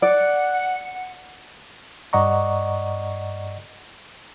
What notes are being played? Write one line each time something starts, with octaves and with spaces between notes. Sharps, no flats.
D5 F#5
G2 D5 D#5 F#5 A#5 C#6